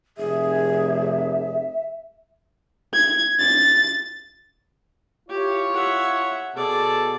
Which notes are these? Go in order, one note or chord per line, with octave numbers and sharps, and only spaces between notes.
F1 G#4 E5
G#6
A6
E4 F4 G4 C#5
E5 F#5
B2 G#4 A4 D5